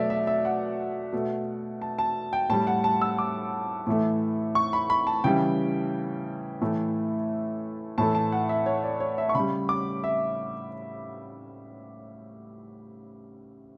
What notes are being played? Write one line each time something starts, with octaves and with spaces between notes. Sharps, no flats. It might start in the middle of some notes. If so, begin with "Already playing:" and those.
Already playing: B2 F#3 A3 D5 E5
E5
E5
F#5
B2 A3
A5
A5
G5
A2 G3 A5
F#5
A5
E6
D6
A2 E3 A3
C#6
B5
B5
A5
C#3 E3 G3 G5
A2 E3 A3
A2 E3 A3 A5
A5
F#5
E5
C#5
D5
C#5
E5
C#6
C#3 G3 B5
D6
E5